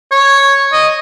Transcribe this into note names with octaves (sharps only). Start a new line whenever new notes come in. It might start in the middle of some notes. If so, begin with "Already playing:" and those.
C#5
D#5